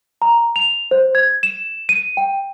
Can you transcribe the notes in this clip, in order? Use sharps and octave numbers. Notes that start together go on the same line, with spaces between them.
A#5
F7
C5
G#6
E7
D#7
G5